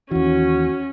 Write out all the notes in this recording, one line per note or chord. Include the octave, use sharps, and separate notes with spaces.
D#2 E3 C#4 F#4